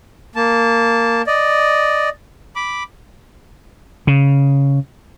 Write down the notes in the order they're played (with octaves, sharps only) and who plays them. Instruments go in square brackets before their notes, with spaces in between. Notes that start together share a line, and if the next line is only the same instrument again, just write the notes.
[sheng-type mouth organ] A#3 A5
D5 D#5
B5 D6
[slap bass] C#3